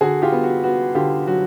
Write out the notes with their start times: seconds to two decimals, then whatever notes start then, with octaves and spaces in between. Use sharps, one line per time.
0.01 D3 F#4 G#4
0.22 F4 G4
0.32 B3
0.44 F#4
0.64 B3 F#4
0.95 D3 F4 G4
1.27 F#3 F#4